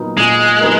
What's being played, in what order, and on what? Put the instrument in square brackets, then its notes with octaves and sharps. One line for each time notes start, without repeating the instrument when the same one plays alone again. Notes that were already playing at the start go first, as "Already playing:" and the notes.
Already playing: [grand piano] A#2 F#3 B3 D#4 A#4
[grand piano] A#2 [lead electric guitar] G#3
[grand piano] F#3 B3 D#4 A#4